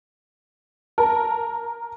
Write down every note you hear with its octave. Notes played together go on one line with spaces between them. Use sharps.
A#4 A5